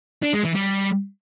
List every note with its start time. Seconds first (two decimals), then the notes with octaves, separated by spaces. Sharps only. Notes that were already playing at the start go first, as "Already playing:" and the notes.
0.23 D4
0.34 G#3
0.44 E3
0.55 G3